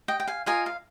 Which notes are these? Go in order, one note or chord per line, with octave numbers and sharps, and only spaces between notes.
D#5 G5
G5
F5 G#5
F4 A#4 D#5 F5 G#5
F5